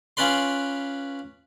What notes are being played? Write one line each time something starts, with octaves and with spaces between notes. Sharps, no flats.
C#4 F4 B4 D5 C6